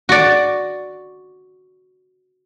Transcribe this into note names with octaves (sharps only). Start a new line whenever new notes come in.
F#4 D5